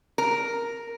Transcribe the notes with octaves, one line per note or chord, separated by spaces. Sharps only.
A#4